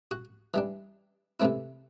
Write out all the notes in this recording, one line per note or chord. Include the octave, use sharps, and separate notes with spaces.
F#4
E3 G3 D4
C3 E3 A3 C4 E4